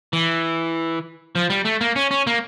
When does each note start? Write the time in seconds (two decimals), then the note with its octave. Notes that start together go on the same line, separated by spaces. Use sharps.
0.13 E3
1.35 F3
1.50 G3
1.65 A3
1.81 A#3
1.96 C#4
2.11 C#4
2.27 A#3